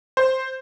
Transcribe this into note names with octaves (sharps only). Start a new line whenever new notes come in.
C5